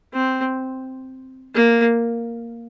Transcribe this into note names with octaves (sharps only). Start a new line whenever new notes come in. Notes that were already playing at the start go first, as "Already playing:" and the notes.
C4
A#3